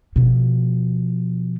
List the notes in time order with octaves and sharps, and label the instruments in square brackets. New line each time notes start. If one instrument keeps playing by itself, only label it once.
[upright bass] B2 F3